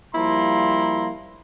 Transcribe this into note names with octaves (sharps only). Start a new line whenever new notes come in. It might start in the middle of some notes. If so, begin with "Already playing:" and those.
F3 G3 A#3 E4 A#5 C6